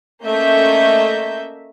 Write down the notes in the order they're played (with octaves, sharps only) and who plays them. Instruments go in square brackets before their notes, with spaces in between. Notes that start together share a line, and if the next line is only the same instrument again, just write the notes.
[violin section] A3 A#3 C#4 D#5 E5 G6